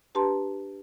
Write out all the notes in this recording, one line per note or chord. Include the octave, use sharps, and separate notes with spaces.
D4 G4 B4 A5 A#5 C6